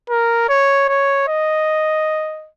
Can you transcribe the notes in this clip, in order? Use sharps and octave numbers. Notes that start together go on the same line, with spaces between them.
A#4
C#5
C#5
D#5